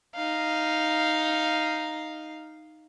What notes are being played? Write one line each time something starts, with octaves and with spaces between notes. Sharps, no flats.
D#4 F5